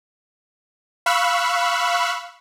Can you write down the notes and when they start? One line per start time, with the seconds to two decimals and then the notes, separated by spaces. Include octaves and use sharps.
1.06 F5 B5 C#6 E6 F#6